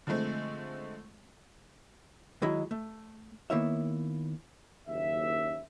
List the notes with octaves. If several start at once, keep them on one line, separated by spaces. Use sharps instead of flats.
D3 F3 G#3 A3 C4
D#3 F#3 G#3 E4
A3
D#3 A#3 B3 E4 C#5 E5
F#1 D#2 E5